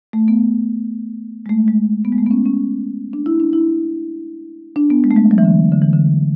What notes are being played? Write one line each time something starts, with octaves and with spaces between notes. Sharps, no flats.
A3
B3
G#3
A3
G#3
B3
G#3
A3
B3
C#4
C#4
D4
E4
D4
E4
D4
B3
G#3
A3
G#3
F#3
E3
D3
D3
E3
D3